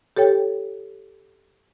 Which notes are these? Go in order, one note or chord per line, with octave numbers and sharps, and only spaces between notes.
G4 A4 C#5 G5